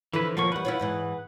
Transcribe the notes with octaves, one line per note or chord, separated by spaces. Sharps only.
D3 E3 F3 E4 B4
D#2 F3 A#3 B3 C#6
E2 G3 B4 F#5
E4 F4 C#5
E2 G#2 E3